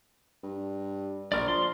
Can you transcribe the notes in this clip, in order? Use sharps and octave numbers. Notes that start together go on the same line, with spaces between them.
G2
A#1 A#4 D5
F3 C6